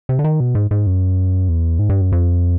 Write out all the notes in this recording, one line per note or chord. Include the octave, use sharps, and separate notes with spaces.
C3
D3
D#3
B2
G#2
G#2
F#2
E2
G#2
G2
F#2
F2